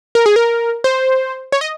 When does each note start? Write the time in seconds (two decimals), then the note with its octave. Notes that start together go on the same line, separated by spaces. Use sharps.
0.15 A#4
0.26 G#4
0.36 A#4
0.84 C5
1.52 C#5
1.61 D#5